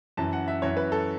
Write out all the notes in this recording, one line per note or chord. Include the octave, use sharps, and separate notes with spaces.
F#2 E3 A5
F#5
E5
F#2 E3 C#5
B4
A4